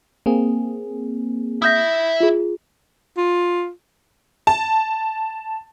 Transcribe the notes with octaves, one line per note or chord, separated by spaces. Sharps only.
A#3 C4 G#4
E4 E5 D#6 G6 A#6
F4 G#4
F4
A5